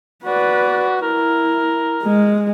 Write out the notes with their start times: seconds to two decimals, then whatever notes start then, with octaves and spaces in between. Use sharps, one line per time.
0.25 F#4 B4 D5
1.02 E4 A#4
2.04 G#3